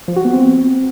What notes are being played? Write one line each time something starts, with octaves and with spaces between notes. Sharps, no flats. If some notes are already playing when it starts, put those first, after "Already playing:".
F3
F#4
B3
C4